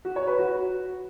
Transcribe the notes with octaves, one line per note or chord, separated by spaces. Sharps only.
F#4
C#5
B4
F#4